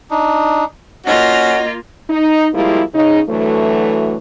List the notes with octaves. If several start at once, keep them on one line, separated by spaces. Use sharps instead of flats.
D4 D#4
A#3 C#4 F4 F#4 D#5
D#4
F3 G3 G#3 A#3 E4
C#3 D#4
D2 E3 F#3 A3